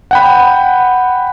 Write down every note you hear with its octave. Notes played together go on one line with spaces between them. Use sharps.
F#5 G5 B5